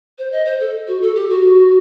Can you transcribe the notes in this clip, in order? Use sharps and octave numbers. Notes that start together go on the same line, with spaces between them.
C5
D#5
C5
A4
F#4
A4
G4
F#4